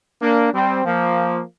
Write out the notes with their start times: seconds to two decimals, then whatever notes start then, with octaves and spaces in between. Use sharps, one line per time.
0.22 A#3 D4
0.54 G3 C4
0.85 F3 A#3